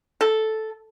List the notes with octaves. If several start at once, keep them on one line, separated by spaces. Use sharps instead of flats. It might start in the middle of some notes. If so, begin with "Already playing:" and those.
A4